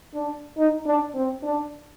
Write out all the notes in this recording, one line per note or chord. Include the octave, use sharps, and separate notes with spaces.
D4
D#4
D4
C4
D4